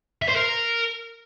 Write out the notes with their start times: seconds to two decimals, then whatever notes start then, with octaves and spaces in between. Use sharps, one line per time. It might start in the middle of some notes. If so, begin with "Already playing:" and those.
0.22 E5
0.28 C5
0.35 A#4